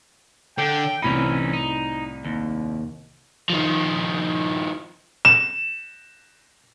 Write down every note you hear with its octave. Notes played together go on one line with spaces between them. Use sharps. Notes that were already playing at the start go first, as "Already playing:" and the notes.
D3 G5
C2 A2 E3 C#4 D#4 B5
D#4
D#2
D#3 F3
E7